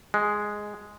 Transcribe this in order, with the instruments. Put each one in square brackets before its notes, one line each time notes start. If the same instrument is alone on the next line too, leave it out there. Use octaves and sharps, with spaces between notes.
[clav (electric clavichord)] G#3